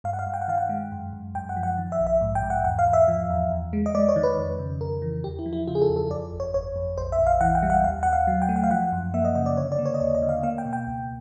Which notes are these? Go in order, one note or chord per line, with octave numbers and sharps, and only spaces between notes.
G2 F5
F#5
F5
G2
G5
F#5
D#3 F5
F#5
G#3
F#2
F#2
F#2 G5
F#5
F3
F#5
D#3
E5
A#1
E5
G#2
G5
G#2
F#5
E2 F#5
F5
E2
E5
F3
E2
E2
G#3
D#5
G#3 D5
C#5
D#3
B4
F2
C#3
F2 A#4
E3
E2 G4
E4
F3
E4
C#3 F4
G#4
A4
E2
A4
F2 D5
G1
C#5
G1 C#5
F2
A#1 C5
E5
A#1
F5
E3 F#5
G5
G3
F#5
D#2 F5
D#2 F#5
F5
F#3
G5
A3
F#5
F5
F3 F#5
F#2
A#3 E5
D#5
C#3 D#5
D5
D3 C#5
D5
A#3
C#5
D#5
D#2 D5
D#5
D3
F5
A#3 F5
G5
B2
G5
C#2